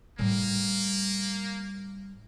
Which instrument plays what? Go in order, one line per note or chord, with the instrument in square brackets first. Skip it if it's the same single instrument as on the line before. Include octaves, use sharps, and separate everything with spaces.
[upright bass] A2 G3 [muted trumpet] A#3